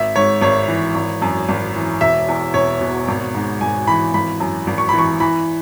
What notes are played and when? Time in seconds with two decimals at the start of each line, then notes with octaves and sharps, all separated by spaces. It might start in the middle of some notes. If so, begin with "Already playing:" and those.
Already playing: G#1 E5
0.16 G#2 C#5
0.41 G#1 C#5
0.68 E3
0.95 G#1
1.22 F#2
1.49 G#1
1.75 E3
2.01 E1 E5
2.28 E2
2.54 E1 C#5
2.81 B2
3.08 G#1
3.35 G#2
3.61 G#1 G#5
3.87 E3 B5
4.14 G#1 B5
4.40 F#2
4.67 G#1
4.78 C#6
4.89 E3 B5
4.99 C#6
5.20 E3 B5